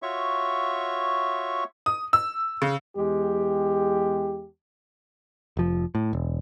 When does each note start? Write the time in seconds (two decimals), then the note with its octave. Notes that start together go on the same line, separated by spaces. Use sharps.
0.02 F4 F#4 C#5 E5 C#6
1.86 D#6
2.13 E6
2.62 C#3
2.97 E2 G#3 G4
5.57 F1 F3
5.95 A2
6.13 E1